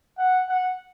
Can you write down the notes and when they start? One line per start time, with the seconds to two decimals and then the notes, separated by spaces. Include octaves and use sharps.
0.18 F#5
0.49 F#5